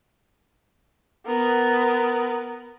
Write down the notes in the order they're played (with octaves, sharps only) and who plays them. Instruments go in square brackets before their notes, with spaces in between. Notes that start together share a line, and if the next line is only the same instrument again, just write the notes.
[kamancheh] B3 A#4